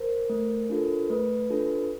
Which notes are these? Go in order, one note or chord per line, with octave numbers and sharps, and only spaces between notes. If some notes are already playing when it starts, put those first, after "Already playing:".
Already playing: A#4 C5
A3
D4 F4 A4
A3 B4
D4 F4 A4